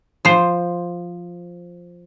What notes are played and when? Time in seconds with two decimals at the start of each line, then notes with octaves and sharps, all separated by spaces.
0.25 F3 C5